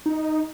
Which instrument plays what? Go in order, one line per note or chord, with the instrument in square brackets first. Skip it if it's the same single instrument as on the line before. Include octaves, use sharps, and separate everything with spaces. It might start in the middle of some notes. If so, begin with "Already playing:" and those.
[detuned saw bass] D#4